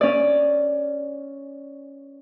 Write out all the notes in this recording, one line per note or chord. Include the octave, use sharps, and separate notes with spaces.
C#4 D5